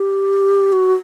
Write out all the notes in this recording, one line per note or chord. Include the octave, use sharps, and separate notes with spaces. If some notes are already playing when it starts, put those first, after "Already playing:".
Already playing: G4
F#4